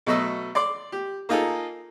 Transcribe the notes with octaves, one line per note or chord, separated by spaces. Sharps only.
B2 F#3 A3 D#5 E6
D5 C6 D6
G4
A#3 D#4 F4 G#4 A4